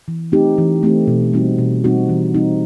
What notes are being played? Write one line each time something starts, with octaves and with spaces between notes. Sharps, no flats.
E3
A3 C4 D#4 G4
E3
A3 C4 D#4 G4
B2
G3 C4 D#4 F#4
B2
G3 C4 D#4 F#4
E3
G3 C4 D#4